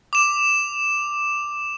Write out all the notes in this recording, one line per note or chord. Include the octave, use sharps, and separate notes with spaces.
D6 E7